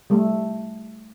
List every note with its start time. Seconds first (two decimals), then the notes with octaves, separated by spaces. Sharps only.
0.10 G3 A3